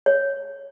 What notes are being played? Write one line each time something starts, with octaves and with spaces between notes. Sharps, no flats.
C#5